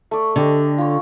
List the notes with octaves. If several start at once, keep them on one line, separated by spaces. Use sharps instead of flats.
A3 D5
D3 D4 G4 D#5
F4 C#5